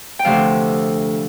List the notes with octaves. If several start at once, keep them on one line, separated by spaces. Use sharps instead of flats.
G5
D2 C3 F3 F5